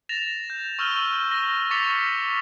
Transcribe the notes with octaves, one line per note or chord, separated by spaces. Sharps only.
A6 A#6 E7 F7
G6
C#6 E6 F6 G6 D#7 G7
A#6
C#6 D6 A6 B6 C#7 F7